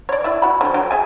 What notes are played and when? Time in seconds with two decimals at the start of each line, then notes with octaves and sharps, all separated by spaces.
0.09 C#5 D5
0.24 E4 D5 E5
0.42 F#4 B5
0.61 D3 F3
0.74 F#3 G4
0.91 G#4 E5 G#5